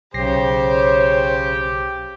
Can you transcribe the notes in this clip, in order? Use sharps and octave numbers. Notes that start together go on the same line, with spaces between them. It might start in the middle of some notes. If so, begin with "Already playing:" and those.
B1 C#3 G4 C5 C#5 A#6 C7